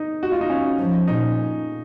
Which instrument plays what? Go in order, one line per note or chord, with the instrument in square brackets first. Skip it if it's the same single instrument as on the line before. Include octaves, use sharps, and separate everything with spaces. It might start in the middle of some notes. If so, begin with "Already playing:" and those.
Already playing: [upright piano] D#4
F#4
F4
D#4
C#4
[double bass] F3
[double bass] A#2 [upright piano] D#4